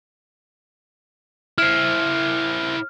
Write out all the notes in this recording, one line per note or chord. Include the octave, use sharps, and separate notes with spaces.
E4 C5 F6